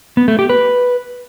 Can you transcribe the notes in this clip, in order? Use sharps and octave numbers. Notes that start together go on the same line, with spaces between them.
B3
A3
G4
B4